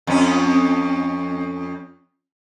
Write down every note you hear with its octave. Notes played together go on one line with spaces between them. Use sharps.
F2 C#4